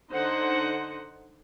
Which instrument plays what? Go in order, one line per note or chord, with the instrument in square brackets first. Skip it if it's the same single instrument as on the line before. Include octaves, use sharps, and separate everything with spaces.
[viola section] D3 D#4 C5 F#5